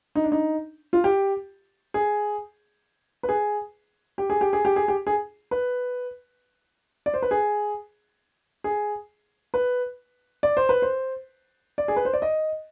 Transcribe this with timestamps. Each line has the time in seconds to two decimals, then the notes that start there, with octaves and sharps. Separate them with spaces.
0.15 D#4
0.24 D4
0.32 D#4
0.93 F4
1.04 G4
1.94 G#4
3.23 B4
3.29 G#4
4.18 G4
4.30 G#4
4.41 G4
4.53 G#4
4.65 G4
4.76 G#4
4.88 G4
5.07 G#4
5.51 B4
7.06 D5
7.14 C5
7.22 B4
7.31 G#4
8.64 G#4
9.54 B4
10.43 D5
10.57 C5
10.69 B4
10.82 C5
11.78 D5
11.88 G#4
11.96 B4
12.05 C5
12.13 D5
12.22 D#5